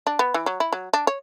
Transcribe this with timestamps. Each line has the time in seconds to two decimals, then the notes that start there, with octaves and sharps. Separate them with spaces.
0.07 D4
0.19 B3
0.34 E3
0.46 F#3
0.60 E4
0.73 F#3
0.93 D4
1.07 C#5